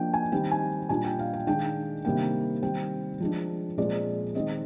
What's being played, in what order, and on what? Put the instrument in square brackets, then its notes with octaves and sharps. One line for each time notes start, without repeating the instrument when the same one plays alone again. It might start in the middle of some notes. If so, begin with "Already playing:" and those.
Already playing: [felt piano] F3 A#3 D4 G5
G#5
D#3 G3 C4 G5
G#5
A#2 G3 D4 G#5
G5
F5
G5
D#3 G#3 D4 G5
C3 D#3 G3 A#3 D4 G5
D#3 G3 C4 G5
F3 G#3 D4
A#2 F3 G#3 C4 D5
D#3 G#3 C4 D#5